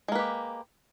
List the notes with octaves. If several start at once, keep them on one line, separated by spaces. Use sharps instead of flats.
G#3 A#3 G4 B4